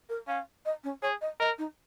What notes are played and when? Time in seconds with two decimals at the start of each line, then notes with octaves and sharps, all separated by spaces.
0.09 A#4
0.27 C#4 F5
0.65 D#5
0.84 C#4
1.02 G#4 C#5
1.21 D#5
1.40 A#4 D#5
1.58 D#4